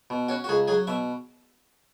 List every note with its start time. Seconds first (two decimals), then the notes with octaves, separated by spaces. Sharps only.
0.10 B2
0.29 C#4 F#4
0.44 F#4
0.49 C#2 G#4
0.68 F#3 G#4
0.87 B2 E5